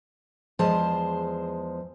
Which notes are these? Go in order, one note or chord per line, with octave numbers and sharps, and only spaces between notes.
E2 F3 G#3 C5 A5